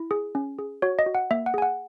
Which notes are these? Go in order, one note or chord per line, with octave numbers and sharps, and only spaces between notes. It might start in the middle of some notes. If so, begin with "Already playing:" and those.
Already playing: E4
G#4
C#4
G#4
F#4 C#5
D#5
F#4
F#5
A#3 E5
F#5
G#4 G#5
F#5